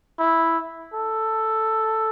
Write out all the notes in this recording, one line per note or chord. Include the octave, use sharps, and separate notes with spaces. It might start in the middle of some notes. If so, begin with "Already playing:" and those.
E4
A4